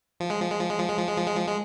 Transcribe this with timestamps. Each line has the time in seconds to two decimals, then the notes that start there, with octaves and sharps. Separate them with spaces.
0.20 F3
0.30 G#3
0.40 F3
0.50 G#3
0.60 F3
0.70 G#3
0.79 F3
0.88 G#3
0.98 F3
1.09 G#3
1.17 F3
1.27 G#3
1.37 F3
1.47 G#3